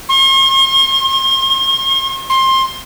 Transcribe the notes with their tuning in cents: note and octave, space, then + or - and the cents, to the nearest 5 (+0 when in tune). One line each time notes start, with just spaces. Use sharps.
C6 +45
C6 +20